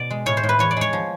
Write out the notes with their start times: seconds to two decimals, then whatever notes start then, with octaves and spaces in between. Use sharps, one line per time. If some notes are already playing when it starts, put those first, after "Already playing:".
Already playing: B2 D5
0.11 G#3
0.26 A2 C#5
0.37 C5
0.44 A2
0.49 B4
0.59 E2 C#5
0.71 D5
0.77 G#3 C#5
0.93 F3